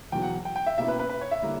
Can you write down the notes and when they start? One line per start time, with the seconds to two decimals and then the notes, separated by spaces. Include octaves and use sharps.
0.12 E2 B2 F#3 G5
0.23 F#5
0.45 G5
0.56 G5
0.66 E5
0.78 B2 A#3 C#4 E4 E5
0.88 B4
0.99 B4
1.09 B4
1.21 C#5
1.31 E5
1.42 D3 G3 A#3 E4